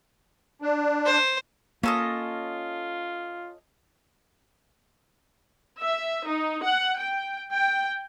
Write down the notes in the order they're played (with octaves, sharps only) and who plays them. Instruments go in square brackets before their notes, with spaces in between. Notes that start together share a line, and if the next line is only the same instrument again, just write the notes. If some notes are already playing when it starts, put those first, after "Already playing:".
[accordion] D4
[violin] C5
[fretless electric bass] A#3 [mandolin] C#4 A4 D#5 [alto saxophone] F4
[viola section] E5
D#4
F#5
G5
G5